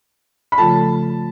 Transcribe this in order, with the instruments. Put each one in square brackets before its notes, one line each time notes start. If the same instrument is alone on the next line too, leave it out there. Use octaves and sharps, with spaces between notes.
[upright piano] B5
[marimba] C#3 F3 A3 F4 A4 [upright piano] A5